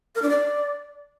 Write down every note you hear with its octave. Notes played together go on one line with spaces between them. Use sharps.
A#4
D4
D5